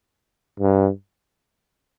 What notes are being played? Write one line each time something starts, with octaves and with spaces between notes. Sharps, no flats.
G2